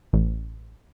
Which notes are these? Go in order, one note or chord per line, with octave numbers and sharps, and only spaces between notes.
A1